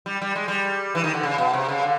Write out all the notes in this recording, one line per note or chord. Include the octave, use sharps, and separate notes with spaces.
G3
G3
G#3
G3
E3
D#3
D3
C#3
B2
C3
C#3
D3